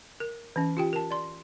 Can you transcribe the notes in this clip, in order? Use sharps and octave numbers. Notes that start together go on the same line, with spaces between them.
A#4
E3 C#4
F4 G4 G5
A#4 A5
D5 C6